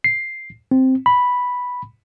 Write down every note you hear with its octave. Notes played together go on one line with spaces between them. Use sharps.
C7
C4
B5